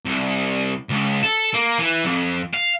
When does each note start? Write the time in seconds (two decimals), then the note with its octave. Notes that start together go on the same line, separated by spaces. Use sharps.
0.05 C2
0.90 C#2
1.24 A4
1.54 A#3
1.79 E3
2.05 F2
2.54 F5